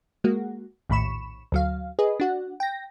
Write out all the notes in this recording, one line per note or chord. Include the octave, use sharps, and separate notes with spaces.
G#3 A#3 F#4
A#1 D#2 A2 B5 C#6 E7
D2 F#3 F5
G#4 B4 D#5
D4 F#4 F#5
G5 A#6